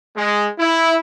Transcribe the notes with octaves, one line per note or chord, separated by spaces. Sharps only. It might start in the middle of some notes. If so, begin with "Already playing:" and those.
G#3
E4